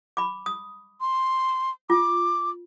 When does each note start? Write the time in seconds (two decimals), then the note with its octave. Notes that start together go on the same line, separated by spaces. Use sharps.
0.17 B5 D6
0.46 D#6
1.01 C6
1.90 F4 D6